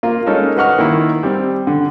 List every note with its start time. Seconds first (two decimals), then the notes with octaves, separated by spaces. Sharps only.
0.03 A#3 F4
0.26 G#3 C#4 D#4 A4 A#4
0.56 F#4 B4 D#5 F#5 C#6 F6
0.78 D#3 A#3 E4
1.23 G3 C4
1.67 D3